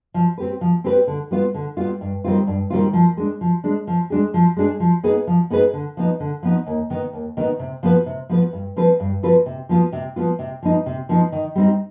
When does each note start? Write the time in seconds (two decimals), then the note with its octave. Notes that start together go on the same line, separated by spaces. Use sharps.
0.14 F3
0.37 C4 G4 B4
0.61 F3
0.84 C4 G4 B4
1.07 D3
1.31 G3 B3 F4
1.54 D3
1.77 G3 B3 F4
2.01 G2
2.24 D#3 G3 C4 F4
2.47 G2
2.70 D#3 G3 C4 F4
2.93 F3
3.17 G#3 D4
3.41 F3
3.64 G#3 D4
3.87 F3
4.10 G#3 D4 G#4
4.34 F3
4.56 G#3 D4 G#4
4.80 F3
5.03 B3 D#4 G#4 B4
5.27 F3
5.50 B3 D#4 G#4 B4
5.73 D3
5.97 F3 B3 D#4
6.20 D3
6.43 F3 B3 D#4
6.67 D#2
6.90 D#3 B3 D#4
7.13 D#2
7.37 D#3 B3 D#4
7.59 C3
7.83 F3 B3 F4 B4
8.06 C3
8.29 F3 B3 F4 B4
8.53 G2
8.76 F3 C4 F4 B4
9.00 G2
9.23 F3 C4 F4 B4
9.46 C3
9.69 F3 B3 F4
9.93 C3
10.16 F3 B3 F4
10.39 C3
10.62 F3 B3 D#4
10.86 C3
11.09 F3 B3 D#4
11.32 D#3
11.55 G3 C4 D#4